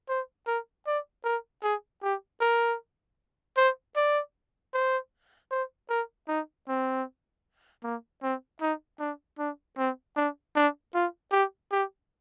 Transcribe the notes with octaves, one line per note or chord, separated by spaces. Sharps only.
C5
A#4
D5
A#4
G#4
G4
A#4
C5
D5
C5
C5
A#4
D#4
C4
A#3
C4
D#4
D4
D4
C4
D4
D4
F4
G4
G4